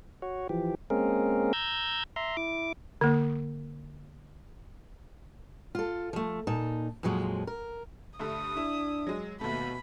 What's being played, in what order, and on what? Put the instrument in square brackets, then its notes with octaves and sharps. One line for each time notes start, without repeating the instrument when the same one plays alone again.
[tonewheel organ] F#4 C#5
E3 F3 G4
G#3 A#3 C4 C#4 G#4 A#4
A#5 E6 G6 G#6
E5 A#5 C6
E4 D6
[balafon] D3 A#3
[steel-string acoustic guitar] F4 A4
F3 A3
A#2 D#4 A5
F2 A#2 F3 F#3 G#3
A#4
[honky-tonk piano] G2 D3 A3 [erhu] D#6
[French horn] D4 [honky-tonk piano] E4
[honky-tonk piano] F#3 G#3
[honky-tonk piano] D#2 A3 [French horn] B2 [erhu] B5